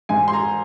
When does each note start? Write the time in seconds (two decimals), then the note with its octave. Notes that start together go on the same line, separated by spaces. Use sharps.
0.09 G#2 G#5
0.28 C6
0.33 A#5